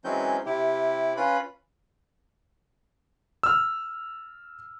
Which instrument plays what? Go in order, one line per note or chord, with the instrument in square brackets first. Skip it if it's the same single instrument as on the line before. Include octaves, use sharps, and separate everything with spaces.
[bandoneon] E3 F#3 G#3 C4 C#4 G6
C3 E4 G4
C#4 F4 B4 B5
[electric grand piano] E6 F6